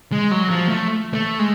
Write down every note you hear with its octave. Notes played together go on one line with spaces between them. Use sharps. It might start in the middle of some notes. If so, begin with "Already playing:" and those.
G#3
F#3
F3
A3
A3
G#3